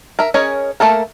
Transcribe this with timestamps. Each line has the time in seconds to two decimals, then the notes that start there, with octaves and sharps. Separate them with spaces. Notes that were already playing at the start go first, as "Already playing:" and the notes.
0.19 A#4 E5
0.34 C#4 G#4 A#4 C#5 D#5
0.80 A3 A#3 A4 A#4